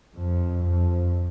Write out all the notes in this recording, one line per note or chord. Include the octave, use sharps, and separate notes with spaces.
F2
F2